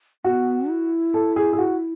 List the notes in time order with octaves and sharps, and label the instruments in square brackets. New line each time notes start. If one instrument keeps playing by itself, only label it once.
[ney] B3 [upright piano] F#4
[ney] E4
[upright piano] A4
G#4
G#4
F#4